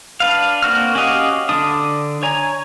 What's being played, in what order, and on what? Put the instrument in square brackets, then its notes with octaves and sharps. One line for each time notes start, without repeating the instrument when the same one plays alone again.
[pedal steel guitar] D4 B4 F5
A#3 C4 F#4 F6
C#4 F#4 G4 D#5 F5
D3 D4 D#6
C#5 G#5 A#5